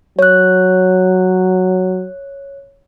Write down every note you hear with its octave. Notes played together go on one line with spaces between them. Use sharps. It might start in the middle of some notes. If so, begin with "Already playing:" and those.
F#3 C#5 F#6